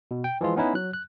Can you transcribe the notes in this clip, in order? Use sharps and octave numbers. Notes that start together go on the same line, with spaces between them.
B2
G5
E3 F3 G#3 F4
B3 C#4 D#4 E4 B4
F#3 F#6
F#6